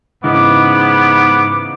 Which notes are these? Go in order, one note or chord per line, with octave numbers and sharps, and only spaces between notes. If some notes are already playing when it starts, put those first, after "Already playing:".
G#2 C#3 E3 B3 D#4 D6